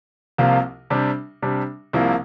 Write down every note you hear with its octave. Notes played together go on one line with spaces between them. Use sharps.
C2 C3 F3 A#3 F4
C3 G3 D4
C3 G3 D4
C2 C3 F3 A#3 E4